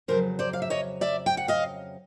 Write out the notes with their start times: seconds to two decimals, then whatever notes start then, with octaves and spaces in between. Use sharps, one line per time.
0.08 F2 C#3 F#3 A#4 C5
0.39 C5 D5
0.53 F5
0.62 E5
0.70 C#5 D#5
1.01 D5 E5
1.26 G5
1.37 F#5
1.48 D#5 F5